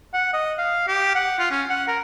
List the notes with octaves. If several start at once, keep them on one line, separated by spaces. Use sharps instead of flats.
F#5
D#5
F5
G4
F#5
F4
C#4
F#5
A#4